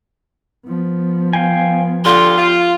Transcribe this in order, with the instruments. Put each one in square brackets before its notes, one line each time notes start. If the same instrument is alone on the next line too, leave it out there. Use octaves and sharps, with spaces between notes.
[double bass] F3 B3
[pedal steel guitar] F5 G5 G#5
[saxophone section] D2 D3 F4 [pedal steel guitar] G4 [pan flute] C6
[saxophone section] F4